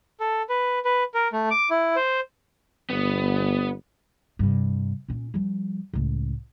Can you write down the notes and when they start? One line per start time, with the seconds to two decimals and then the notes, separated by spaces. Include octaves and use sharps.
0.20 A4
0.49 B4
0.85 B4
1.14 A#4
1.33 A3
1.51 D6
1.70 E4
1.96 C5
2.90 G1 B3
4.39 G2 C3
5.08 A#2 C#4
5.34 F3 G3
5.93 C#2 A2